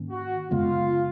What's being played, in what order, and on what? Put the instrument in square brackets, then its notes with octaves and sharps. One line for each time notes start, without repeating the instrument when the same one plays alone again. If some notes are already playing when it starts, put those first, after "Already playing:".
Already playing: [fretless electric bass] G#2 D#3 A#3 C#4
[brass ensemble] F#4
[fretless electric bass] F#2 C#3 G#3 B3 [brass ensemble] F4